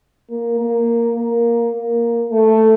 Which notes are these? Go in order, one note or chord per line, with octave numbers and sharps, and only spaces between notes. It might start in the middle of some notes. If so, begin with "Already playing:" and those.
A#3
A#3
A#3
A#3
A3